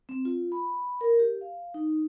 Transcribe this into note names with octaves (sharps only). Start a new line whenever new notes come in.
C4
F4
B5
A#4
G4
F5
D#4